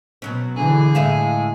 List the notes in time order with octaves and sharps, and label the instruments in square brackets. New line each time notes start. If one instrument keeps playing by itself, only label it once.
[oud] B2 F#3 C#4
[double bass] D3 E3 [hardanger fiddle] G#4
[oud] A2 E5 F5 [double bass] G#3